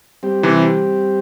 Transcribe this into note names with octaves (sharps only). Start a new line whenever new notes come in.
G3 C4 G4
C3 E3